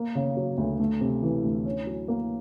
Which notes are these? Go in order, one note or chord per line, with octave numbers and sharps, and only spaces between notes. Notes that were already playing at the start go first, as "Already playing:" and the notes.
Already playing: A#3
C#3
F#3
D2
A3
C3
E3
D2
C#4
F#3
A#3